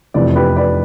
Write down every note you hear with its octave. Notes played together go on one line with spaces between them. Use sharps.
F1 E2 C3 B4 D5
G4 B4
B4 D5